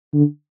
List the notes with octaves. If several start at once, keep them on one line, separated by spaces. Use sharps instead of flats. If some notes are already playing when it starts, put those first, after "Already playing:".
D3